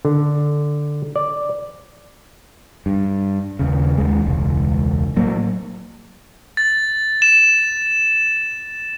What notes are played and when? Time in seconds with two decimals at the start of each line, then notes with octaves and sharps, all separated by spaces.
0.05 D3
1.16 D5
2.86 G2
3.59 D#2 C#3
3.98 D#2 G#3
4.26 E1 C#2
5.17 A2 F#3 A#3
6.57 A6
7.22 E7